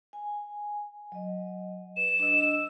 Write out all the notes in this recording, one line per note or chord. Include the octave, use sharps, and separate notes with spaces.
G#5
F#3 D#5
B4 E7
D4 D#5 E6